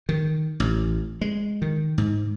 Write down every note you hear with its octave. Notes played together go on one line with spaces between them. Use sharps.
D#3
A1
G#3
D#3
G#2